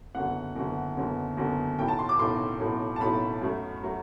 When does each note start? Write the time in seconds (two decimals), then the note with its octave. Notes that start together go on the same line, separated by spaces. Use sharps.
0.15 F#1 E2 D3 F#3 F#5
0.55 F#1 E2 D3 F#3
0.97 F#1 E2 D3 F#3
1.37 F#1 E2 D3 F#3
1.78 B1 A2 F#3 G5
1.88 A5
1.99 C6
2.09 D6
2.19 B1 A2 F#3 C6
2.60 B1 A2 F#3
2.96 A5
3.01 B1 A2 F#3 B5
3.42 F#2 F#3 A3
3.83 F#3 A3